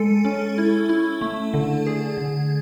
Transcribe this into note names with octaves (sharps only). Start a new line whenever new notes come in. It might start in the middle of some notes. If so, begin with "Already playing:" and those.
Already playing: G#3 A4
C#4
E4
E4
A3
D3
G#4
D3